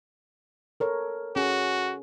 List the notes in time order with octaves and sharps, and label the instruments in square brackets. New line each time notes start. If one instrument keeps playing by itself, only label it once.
[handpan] A4 A#4 C#5
[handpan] C#4 G#4 [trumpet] F#4